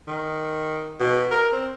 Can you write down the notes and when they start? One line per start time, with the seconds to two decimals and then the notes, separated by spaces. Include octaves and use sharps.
0.07 D#3
1.00 B2
1.31 A#4
1.52 C4